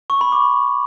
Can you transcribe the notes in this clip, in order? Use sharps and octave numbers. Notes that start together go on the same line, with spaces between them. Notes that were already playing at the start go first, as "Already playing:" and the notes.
C#6
B5
D6